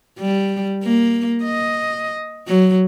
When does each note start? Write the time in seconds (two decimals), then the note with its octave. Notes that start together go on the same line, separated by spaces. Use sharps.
0.19 G3
0.84 A#3
1.44 D#5
2.47 F#3